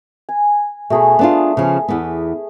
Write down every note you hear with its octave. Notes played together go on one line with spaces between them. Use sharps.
G#5
B2 A3 G#4 B4
B3 D4 F4
C#3 F3
E2 B3